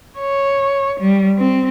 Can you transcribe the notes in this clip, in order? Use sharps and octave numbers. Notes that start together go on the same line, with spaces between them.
C#5
G3
C4